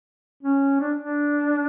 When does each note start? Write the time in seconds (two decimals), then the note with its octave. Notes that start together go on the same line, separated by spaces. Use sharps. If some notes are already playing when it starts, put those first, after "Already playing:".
0.43 C#4
0.80 D4
1.01 D4